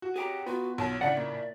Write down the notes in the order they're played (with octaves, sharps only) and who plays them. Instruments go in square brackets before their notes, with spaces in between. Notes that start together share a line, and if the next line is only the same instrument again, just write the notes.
[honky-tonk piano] F#4
[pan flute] G4 [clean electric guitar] G#4 G5 A#5
[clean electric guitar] B3 F4 [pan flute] F#4 [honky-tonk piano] B4
[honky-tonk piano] B1 A5 [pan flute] C#5
[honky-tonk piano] A2 C#3 D4 [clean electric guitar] D5 [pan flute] E5 [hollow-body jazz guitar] F#5
[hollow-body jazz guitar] A#2